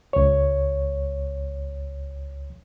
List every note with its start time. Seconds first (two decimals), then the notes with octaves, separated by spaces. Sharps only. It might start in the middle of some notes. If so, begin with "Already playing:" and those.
0.13 C#2 C#5